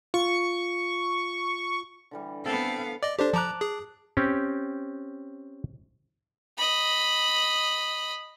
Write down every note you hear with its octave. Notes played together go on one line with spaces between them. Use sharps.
F4 C#6
D3 E3 G3
B3 C4 A4 F5
D5 D#5 D6
D4 G4 A4 C5 D5
F3 A5 A#5 D6 F#6
G#4
C4 C#4 G4
D#5 B5